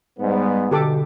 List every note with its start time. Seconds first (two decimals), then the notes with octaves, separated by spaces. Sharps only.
0.19 G#2 G3 B3
0.71 B2 D3 G4 A4 D6